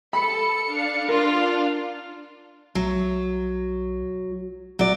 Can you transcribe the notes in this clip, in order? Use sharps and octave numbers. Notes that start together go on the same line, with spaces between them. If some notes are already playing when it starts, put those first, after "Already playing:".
A4 B5 C#7
D4 F5
F4 A#4
B1 F#3
A1 F#3 D5